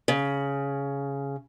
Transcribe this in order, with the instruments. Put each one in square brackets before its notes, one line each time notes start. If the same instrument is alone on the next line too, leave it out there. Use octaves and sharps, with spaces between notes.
[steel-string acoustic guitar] C#3